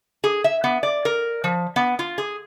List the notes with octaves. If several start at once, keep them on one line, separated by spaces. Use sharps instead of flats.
G#4
E5
B3
D5
A#4
F3
B3
F4
G#4